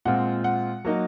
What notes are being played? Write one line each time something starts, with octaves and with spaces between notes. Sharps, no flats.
A#2 G#3 C4 F4 F#5
F#5
F#3 A#3 D#4